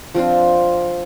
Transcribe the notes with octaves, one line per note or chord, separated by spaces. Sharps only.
F3 C4 D4 F4